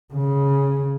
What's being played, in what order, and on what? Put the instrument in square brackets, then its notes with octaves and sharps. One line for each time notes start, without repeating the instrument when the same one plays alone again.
[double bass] C#3